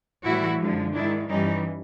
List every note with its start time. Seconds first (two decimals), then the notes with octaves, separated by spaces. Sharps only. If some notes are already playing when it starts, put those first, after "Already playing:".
0.24 A2 E3 G3 E4 F#4
0.59 F#2 D3 F3 G#3
0.94 G#2 D#3 G#3 D4 E4
1.28 G2 E3 G3 C#4 D#4